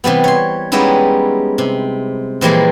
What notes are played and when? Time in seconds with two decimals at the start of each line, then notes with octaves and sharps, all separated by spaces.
0.04 C3 E3 G3 B3
0.24 C#5 C6
0.72 G3 G#3 B3 C#4 D#4 E4
1.58 C3
2.41 A#2 E3 F3 G3 G#3 A#3